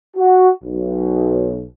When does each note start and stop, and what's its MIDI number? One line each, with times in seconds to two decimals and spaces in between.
0.16 0.50 66
0.64 1.65 35